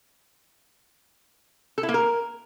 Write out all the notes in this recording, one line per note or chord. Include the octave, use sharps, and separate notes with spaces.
A4
E4
A#3
A#4